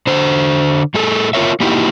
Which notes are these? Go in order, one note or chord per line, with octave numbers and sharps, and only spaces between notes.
D3 C5
A2 A3 G#4 A4
F4 A#4 C#5 E5
A#3 D#4 E4 F#4 G4